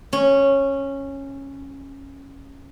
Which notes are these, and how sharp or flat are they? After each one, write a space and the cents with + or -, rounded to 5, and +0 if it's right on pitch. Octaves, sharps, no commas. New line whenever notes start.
C#4 -10